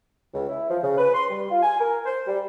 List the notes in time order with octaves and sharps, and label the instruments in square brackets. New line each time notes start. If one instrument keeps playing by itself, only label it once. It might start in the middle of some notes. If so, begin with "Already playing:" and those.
[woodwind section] C#2
E4
F3
C#3
B4
C6
G3
F4
G#5
A#4
C5
G3